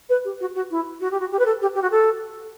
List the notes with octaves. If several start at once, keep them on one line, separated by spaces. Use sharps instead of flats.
B4
G4
F#4
F#4
E4
F#4
G4
F#4
G4
B4
A4
G4
G4
F#4
A4